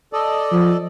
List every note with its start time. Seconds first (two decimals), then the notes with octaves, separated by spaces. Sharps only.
0.13 A4 D5 D#5
0.52 F3